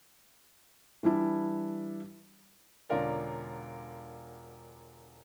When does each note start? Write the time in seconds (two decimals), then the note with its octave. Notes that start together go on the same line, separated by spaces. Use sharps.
1.03 E3 G3 D4 E4
2.89 E1 D3 C#4 F4 A#4 D5